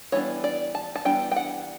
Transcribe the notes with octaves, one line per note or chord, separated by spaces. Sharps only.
E3 G3 B3 D4 C#5
D5
A5
A5
E3 G3 B3 D4 G5
G5
F#5